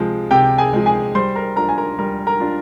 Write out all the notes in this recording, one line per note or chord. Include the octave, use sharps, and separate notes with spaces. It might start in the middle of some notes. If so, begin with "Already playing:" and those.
Already playing: C3 F3 G#3
C3 G4 G5
G#4 G#5
F3 G#3
G#4 G#5
G3 C5 C6
A#4 A#5
D4 F4 A#4 A#5
G#5
A#4 A#5
G3 A#4 A#5
A#4 A#5
D4 F4